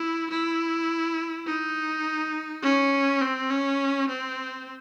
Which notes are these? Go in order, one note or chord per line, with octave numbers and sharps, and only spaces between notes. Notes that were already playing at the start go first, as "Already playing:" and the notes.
Already playing: E4
E4
D#4
C#4
C4
C#4
C4